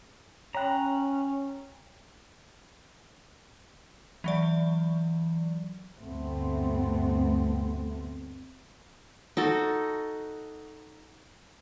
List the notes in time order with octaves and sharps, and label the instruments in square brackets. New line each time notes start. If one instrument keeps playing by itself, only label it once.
[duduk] C#4 [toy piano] C#5 G5 B5 [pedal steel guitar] A#5 F#6
[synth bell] E3 F#3 D5
[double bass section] D2 G2 A3 B3 C4
[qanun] D#4 F#4 A4